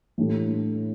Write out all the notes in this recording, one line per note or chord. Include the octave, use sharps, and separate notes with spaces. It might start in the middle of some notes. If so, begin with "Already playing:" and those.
A2 E3 A3 D4 G4